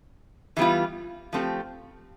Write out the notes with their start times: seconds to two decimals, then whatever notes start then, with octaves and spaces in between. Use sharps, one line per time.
0.57 E3 G3 B3 F4
1.33 F3 A3 C4 G4